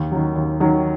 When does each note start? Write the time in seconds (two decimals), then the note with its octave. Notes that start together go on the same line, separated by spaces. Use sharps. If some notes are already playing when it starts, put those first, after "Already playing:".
Already playing: D#2
0.12 D#3 F#3
0.36 D#2
0.60 D#3 F#3